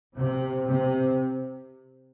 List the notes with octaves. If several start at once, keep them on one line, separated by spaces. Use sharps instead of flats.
C3
C3